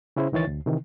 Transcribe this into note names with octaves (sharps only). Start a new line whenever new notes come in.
C#3 C#4 E4 G#4 C5
C#2 D#3 E3 C#5 A6
D2
C3 D#3 E3